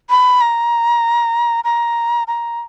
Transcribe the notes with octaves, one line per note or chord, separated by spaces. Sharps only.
B5
A#5
A#5
A#5